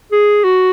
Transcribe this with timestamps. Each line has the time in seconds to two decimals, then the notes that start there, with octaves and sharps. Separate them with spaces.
0.12 G#4
0.44 F#4